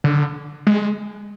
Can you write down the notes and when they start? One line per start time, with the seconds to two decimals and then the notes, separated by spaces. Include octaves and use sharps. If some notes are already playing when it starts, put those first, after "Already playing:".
0.04 D3
0.67 G#3